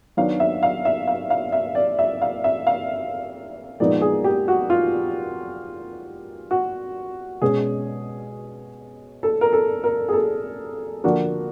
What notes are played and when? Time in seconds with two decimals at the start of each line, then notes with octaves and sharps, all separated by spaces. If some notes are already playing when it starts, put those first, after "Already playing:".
0.17 D#3 F#3 B3 D4 F5
0.40 E5
0.63 F5
0.85 E5
1.07 F5
1.30 F5
1.52 E5
1.75 D5
1.99 E5
2.22 F5
2.44 E5
2.67 F5
3.80 A#2 F3 G#3 B3 D#4 D5
4.02 G#4
4.24 G4
4.48 F#4
4.70 F4
6.51 F#4
7.42 B2 G#3 C#4 G#4
9.23 A4
9.41 A#4
9.53 A4
9.84 A#4
10.09 G#4
10.13 A4
11.04 D3 F3 A#3 D4 F#4